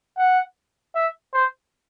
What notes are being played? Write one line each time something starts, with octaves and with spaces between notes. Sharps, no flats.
F#5
E5
C5